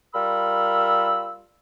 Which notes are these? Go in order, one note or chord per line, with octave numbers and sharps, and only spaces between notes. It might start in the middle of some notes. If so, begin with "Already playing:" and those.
G3 F4 A#4 B5 E6